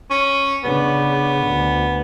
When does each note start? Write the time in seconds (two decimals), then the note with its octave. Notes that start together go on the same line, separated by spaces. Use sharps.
0.10 C#4
0.64 C#3 B3 D4
1.47 D2